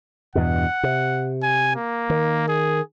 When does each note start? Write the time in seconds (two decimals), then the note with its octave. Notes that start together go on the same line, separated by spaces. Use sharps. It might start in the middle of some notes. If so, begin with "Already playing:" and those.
0.35 E2 G2 B2 F#5
0.83 C3
1.43 G#5
1.76 A#3
2.10 D#3
2.48 G#4